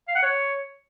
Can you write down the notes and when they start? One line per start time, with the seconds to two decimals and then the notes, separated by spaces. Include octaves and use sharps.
0.08 F5
0.15 F#5
0.23 C#5